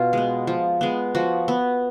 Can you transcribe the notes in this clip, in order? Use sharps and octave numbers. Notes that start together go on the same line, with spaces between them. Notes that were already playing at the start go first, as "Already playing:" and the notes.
Already playing: B2 F4
G#3 B3
F3
G#3 B3
F3 F#4
B3